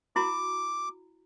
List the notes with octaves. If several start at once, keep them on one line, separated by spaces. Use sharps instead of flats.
E4 F#4 A#5 D6